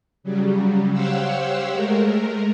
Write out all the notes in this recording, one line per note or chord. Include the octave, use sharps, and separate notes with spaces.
C#3 F#3 G3
G4 C5 C#5 F5 F#5 E6
G#3 A3 A#4